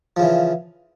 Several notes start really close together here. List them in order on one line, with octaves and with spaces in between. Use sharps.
F3 C#3 E3